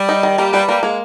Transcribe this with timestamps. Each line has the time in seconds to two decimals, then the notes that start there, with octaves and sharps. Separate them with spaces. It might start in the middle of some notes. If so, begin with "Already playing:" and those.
Already playing: G3
0.09 D#4
0.23 D#3
0.38 G3 A#3
0.53 G3 B4
0.68 G3 A#3
0.83 G#3 A#3